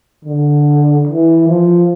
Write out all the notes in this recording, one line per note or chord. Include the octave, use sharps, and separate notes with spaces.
D3
E3
F3